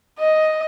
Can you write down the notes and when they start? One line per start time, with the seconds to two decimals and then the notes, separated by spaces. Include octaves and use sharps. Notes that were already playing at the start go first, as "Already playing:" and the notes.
0.19 D#5